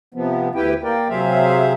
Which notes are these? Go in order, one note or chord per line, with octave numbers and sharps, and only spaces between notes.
C3 F3 B3
D2 E4 G4 B4 G5
A#3 A#4 D5 G5
C3 F#3 G#4 C5 E5 F5